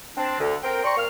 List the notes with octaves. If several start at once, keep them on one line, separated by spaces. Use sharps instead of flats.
C4 D4
D2 D3
C4 A#4 G5
C5 D5 G5 A#5 C6 C#6
A#2 F5 F6